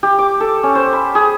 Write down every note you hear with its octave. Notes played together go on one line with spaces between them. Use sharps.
G4
D6
A4
C#4
C5
B5
G#4